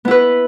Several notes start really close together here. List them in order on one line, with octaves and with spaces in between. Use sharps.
B3 E4 B4